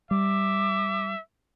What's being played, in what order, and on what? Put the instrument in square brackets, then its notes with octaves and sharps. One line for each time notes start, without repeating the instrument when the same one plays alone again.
[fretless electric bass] G3 [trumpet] E5 [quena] D6